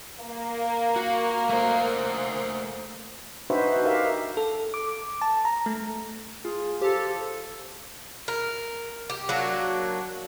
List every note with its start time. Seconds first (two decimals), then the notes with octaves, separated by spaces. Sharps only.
0.22 A#3
0.96 F#4
1.49 A3 C5
3.50 D4 D#4 F#4 B4 C5 E5
3.84 D#4 G4 A#4 E5 F5
4.37 A4
4.74 D6
5.21 A5
5.45 A#5
5.66 A3
6.44 F4 G#4
6.81 F3 G4 A4
8.28 A#4
9.10 G4
9.29 F#3 A#3 D4